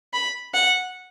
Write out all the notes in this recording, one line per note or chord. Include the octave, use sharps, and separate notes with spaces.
B5
F#5